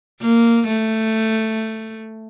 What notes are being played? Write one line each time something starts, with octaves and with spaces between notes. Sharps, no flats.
A#3
A3